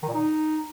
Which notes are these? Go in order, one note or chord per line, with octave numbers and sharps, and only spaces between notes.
D#3
A#2
D#4